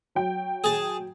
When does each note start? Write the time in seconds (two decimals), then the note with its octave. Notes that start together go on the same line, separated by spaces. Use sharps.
0.15 F#3 G5
0.64 G#4 A5